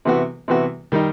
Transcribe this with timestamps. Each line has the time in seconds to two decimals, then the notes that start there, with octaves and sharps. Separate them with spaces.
0.05 C3 E3 B3 F#4
0.48 C3 E3 B3 F#4
0.92 D#3 G3 D#4